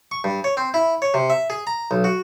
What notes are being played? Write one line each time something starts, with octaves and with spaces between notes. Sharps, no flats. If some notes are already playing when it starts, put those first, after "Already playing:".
C#6
G2
C#5
C4
E4
C#5
C3
E5
G#4
A#5
B1
F#4